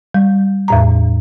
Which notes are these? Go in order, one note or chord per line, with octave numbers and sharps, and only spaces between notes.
G3
E2 A2 A#5